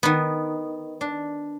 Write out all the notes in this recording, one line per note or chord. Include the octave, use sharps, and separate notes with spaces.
D#3 B3
D4